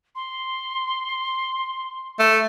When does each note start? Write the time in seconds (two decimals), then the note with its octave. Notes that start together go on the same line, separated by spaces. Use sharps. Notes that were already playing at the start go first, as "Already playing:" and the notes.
0.15 C6
2.19 A3